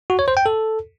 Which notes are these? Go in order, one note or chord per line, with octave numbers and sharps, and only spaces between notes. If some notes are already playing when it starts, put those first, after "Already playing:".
F#4
C#5
C5
G5
A4